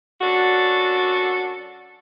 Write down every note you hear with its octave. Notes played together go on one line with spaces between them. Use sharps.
F#2 D4 F#4 A4